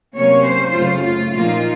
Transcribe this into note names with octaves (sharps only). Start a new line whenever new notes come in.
C3 F#3 A#3 C#4 C#5
C5
F#2 C#3 A3 F4
F4
A#2 F3 A#3 D#4 F4